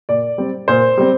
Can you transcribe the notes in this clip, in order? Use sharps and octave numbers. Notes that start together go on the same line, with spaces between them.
A#2 D5
G3 C4
A#2 C5
G3 C4